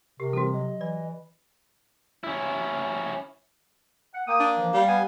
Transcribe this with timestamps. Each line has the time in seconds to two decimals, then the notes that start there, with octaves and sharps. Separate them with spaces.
0.20 C3 G4 A#4
0.33 E3 G3 C4 F#4 A4
0.54 F#3 D#5
0.81 E3 D5
2.24 C#4 E4
4.15 F#5
4.28 A#3 G5 D#6
4.39 D4
4.57 E3 F3
4.74 G3 F5
4.88 B3 G#5